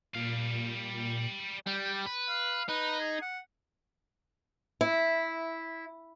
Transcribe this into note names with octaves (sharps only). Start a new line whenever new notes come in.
A#2 G3 F5
G3 G5
B4
F5
D#4 B4
G#4
F#5
E4